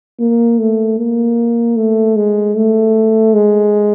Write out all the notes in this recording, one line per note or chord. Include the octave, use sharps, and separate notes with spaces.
A#3
A3
A#3
A3
G#3
A3
G#3